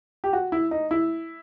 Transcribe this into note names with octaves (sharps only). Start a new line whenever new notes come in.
G4
F#4
E4
D#4
E4